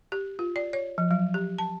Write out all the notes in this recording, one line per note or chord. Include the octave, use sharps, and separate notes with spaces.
G4
F4
D5
C#5
F3
F#3
G4
A5